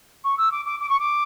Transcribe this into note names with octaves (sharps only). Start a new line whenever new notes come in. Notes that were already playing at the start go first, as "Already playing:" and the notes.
C#6
E6
D6
D6
D6
C#6
D6